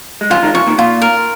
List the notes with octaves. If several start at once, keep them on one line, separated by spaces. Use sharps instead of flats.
G#3
C#3 F3 F4
D#3 G#3
C#3 F3 C#6
A#2 D#3
A#2 F4
A#4